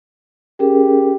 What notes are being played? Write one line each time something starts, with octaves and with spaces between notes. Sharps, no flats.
C#4 G4 G#4 A#4